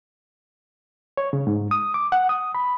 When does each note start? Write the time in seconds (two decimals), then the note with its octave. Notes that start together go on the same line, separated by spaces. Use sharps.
1.17 C#5
1.33 C#3
1.47 G#2
1.71 D#6
1.94 D6
2.12 F#5
2.29 D#6
2.55 B5